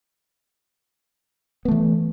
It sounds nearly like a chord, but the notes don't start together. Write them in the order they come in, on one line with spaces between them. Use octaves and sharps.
B3 A3 E3